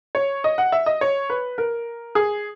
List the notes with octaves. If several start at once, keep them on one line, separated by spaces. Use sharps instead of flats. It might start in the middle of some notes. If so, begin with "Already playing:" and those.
C#5
D#5
F#5
E5
D#5
C#5
B4
A#4
G#4